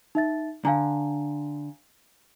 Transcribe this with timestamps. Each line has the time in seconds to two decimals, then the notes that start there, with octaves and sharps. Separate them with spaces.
0.15 D#4 E5 A6
0.65 D3 F5 G#5 A#5